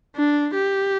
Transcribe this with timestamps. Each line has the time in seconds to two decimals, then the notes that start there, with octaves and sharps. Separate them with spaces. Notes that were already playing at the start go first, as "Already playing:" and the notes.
0.16 D4
0.54 G4